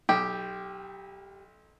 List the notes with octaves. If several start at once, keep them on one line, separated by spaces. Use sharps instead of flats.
B1 G4